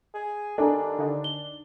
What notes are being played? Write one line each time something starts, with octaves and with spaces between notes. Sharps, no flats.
G#4
D#2 D4 A4 G#5 A#5
D3 D#4
G7